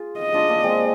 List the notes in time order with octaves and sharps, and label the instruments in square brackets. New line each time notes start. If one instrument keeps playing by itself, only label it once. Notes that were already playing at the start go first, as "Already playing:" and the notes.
Already playing: [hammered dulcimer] F4 G#4
[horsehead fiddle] D#5
[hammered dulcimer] D4 F4
A#3 D4
G#3 C4